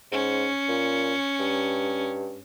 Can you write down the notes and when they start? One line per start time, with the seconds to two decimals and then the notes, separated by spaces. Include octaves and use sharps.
0.12 G#2 C#4
0.68 A#2
1.40 G2